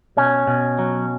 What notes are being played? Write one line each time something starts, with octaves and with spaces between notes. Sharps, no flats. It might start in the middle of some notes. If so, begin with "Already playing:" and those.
B2 C#4
B2
F#3